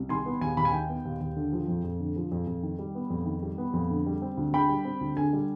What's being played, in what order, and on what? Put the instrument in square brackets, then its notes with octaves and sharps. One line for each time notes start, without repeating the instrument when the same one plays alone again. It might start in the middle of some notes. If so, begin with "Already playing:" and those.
Already playing: [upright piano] C2
D#3 G#5 C6
B3
D#2 G#5
D#2 B5
G#5
D#3 G5
B3
D#2
D#2
D3
F3
F2
F2
D3
F3
F2
F2
D#3
G3
B3
F2
D#3
G3
B3
F2
D3
G3
C4
D2
D3 G5 B5
G3
C4
D2
D3 G#5
G3